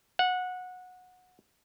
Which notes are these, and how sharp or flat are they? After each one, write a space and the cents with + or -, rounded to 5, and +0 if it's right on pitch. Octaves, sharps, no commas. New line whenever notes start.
F#5 -20